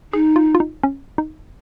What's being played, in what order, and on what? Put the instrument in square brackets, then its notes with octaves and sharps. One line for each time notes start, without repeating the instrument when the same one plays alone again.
[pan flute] D#4 [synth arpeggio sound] G#4
[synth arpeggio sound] F4
F4
D#4
C#4
D#4